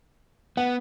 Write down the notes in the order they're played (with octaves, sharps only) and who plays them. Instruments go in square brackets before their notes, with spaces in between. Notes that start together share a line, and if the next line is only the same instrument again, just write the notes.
[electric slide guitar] B3 [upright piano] F#5